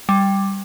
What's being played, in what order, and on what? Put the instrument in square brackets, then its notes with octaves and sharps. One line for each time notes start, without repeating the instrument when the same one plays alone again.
[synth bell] G3